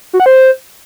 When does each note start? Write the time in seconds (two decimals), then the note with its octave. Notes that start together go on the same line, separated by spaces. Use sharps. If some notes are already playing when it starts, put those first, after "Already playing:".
0.13 F#4
0.20 F#5
0.26 C5